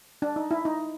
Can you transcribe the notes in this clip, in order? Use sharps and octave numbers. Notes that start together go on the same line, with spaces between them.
D4
D#4
E4
D#4